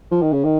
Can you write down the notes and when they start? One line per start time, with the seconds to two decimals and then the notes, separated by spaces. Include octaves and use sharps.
0.11 F3
0.22 D#3
0.32 C#3
0.44 D#3